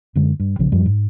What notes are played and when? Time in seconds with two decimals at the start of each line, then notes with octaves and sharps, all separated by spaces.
0.15 F#2 D3 G#3
0.40 G2
0.59 A#1 C#3 F3
0.72 F#2 F3 G3
0.86 G#2